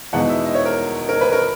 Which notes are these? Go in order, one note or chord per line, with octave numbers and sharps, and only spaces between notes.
E2 B2 G#3 B3 D#4 F#5
E5
D#5
C#5
A#4
A#4
B4
A#4